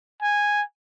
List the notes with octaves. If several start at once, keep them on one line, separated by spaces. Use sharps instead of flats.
G#5